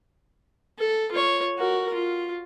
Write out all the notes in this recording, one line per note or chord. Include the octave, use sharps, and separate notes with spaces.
A4
F4 C#5
F#4 A#4
F4